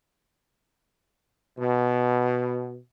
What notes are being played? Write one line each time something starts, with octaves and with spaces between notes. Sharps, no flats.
B2